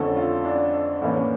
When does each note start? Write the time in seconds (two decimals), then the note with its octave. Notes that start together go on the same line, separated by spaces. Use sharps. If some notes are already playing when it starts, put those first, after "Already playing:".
Already playing: F2 D3 A3 C#4 A4
0.17 F4
0.45 D4
1.02 A2 E3 A#3 C#4